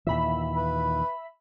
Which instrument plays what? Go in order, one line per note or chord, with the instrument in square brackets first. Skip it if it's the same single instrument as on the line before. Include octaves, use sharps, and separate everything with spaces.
[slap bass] D#2 A#2 E3 [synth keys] E5 B5
[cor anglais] B4